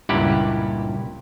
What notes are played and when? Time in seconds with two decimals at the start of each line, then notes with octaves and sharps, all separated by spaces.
0.09 C#2 G2 A#2 E4 G4 F#5